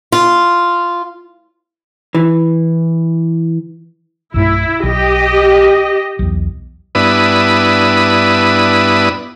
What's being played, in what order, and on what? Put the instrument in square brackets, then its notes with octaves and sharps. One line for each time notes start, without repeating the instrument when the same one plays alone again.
[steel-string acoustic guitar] F4
[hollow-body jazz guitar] E3
[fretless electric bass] B1 G2 A3 [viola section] E4
[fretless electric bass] B1 [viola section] G4 D#5
[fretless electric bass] B1 E2
[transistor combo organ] G2 B3 D4 E4 B4 D#6